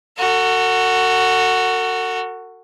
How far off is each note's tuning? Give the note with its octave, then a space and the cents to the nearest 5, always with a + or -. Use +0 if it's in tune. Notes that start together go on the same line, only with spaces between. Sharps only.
F#4 +0 A4 +45